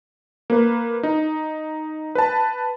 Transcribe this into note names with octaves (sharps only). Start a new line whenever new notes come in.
A#3 B4
D#4
B4 A5